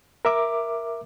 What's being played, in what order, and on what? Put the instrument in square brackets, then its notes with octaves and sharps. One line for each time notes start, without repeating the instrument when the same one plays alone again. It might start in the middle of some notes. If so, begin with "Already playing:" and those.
[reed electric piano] A#4 E5 D6